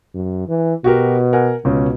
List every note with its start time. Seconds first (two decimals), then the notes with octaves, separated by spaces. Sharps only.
0.15 F#2
0.48 E3
0.84 B2 F#4 G4 A#4
1.33 A#4 F#5 G#5
1.65 C#2 B2 C#4